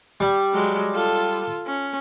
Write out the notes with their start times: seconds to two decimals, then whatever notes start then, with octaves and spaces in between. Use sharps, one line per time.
0.20 G3
0.53 F#3 G#3
0.95 F4 A4
1.67 C#4